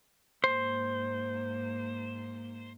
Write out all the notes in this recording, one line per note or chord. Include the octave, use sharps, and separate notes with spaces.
G#2 A#3 C5